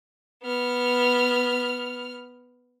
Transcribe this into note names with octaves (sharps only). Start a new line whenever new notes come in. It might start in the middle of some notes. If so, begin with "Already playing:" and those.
B3 F6